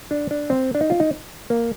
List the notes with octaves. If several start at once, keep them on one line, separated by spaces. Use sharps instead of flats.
D4
D4
C4
D4
D#4
F4
D#4
A#3